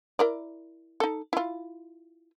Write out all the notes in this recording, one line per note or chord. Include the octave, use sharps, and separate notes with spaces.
E4 A#4 D5
D#4 A4
E4 F4